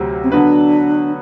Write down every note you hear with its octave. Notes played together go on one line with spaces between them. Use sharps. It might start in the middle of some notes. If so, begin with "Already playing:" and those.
Already playing: D2 C3 F#3
C4
D3 F#3 B3 D4 F#4 B4